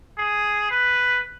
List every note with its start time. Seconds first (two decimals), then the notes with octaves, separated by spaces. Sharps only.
0.18 G#4
0.71 B4